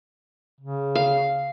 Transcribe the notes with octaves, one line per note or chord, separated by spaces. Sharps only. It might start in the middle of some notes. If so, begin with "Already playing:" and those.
C#3
F5